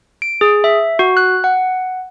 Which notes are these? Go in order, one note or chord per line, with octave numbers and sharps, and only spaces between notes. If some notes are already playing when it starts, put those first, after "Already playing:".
D7
G#4
E5
F#4
F#6
F#5